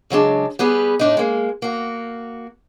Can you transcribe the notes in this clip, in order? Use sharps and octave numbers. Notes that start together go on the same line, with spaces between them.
C#3 F#3 G#3 D4
G3 B3 G#4 B4
A2 D4 D#4
G#3 A#3
A#3 F#4